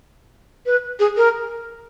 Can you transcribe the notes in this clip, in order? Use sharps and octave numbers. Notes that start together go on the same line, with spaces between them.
B4
G#4
A#4